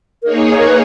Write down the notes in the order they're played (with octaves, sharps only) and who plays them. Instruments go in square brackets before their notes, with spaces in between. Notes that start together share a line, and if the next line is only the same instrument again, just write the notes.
[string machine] A#3 D#4 G#4 C#5 [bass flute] A#4
[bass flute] A#4
B4